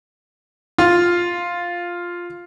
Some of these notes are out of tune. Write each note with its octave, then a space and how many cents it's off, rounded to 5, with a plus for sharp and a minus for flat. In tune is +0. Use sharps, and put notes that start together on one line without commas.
F4 +0 F5 +0